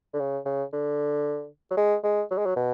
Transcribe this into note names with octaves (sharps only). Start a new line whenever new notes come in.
D3
C#3
C#3
D3
F#3
G#3
G#3
F#3
G#3
F#3
B2